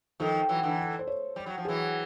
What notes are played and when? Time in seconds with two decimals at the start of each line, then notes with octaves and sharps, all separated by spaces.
0.20 D#3 F3 A4
0.49 E3 F#3
0.63 D3 E3
0.99 C5
1.07 C#5
1.36 G3
1.46 F#3
1.58 F3
1.65 E3 F#3 G#4